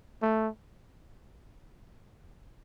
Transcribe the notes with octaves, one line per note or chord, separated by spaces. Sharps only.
A3